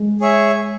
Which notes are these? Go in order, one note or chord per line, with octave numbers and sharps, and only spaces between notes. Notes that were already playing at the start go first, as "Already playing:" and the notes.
Already playing: G#3
G#4 C#5 E5